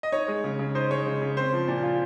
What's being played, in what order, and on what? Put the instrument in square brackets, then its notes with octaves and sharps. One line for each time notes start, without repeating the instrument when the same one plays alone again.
[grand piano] D#5
D#4 C#5
G#3
C#3
C#3
D#4 C5
G#3 C#5
C#3
C#3
C4 C5
F3
A#2
F4